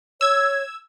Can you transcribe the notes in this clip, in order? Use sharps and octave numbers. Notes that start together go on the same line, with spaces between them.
C#5 E6 G#6